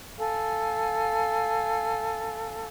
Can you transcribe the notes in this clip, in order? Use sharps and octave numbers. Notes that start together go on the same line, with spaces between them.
A4 F5 G#5